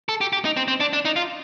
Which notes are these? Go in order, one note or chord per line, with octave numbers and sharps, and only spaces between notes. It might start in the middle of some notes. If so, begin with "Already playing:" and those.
A4
G4
G4
D#4
C4
C4
D4
D4
D#4
F4